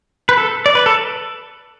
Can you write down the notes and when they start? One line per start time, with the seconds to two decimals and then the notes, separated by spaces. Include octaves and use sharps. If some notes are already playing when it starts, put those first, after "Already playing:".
0.29 B4
0.38 A4
0.66 D5
0.75 B4
0.86 A4